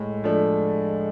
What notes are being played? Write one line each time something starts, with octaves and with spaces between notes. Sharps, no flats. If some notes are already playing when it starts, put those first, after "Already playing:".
Already playing: A2 G#3
F3 A3 D4